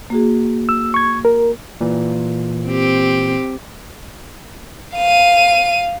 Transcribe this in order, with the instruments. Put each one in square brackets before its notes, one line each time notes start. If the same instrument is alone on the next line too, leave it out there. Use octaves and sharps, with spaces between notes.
[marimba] A#3 F#4 G#4
[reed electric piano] E6
C#6 G#6
A#4
[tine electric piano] A#2 E3
[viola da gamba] C4 G4
[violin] F5 D#7